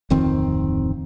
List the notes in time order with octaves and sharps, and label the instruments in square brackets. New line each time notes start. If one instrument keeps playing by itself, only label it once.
[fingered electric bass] D1 F2 D#3 C4